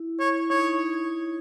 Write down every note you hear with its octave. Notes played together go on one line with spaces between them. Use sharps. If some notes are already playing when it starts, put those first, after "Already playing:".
Already playing: E4
C#5
D#4 C#5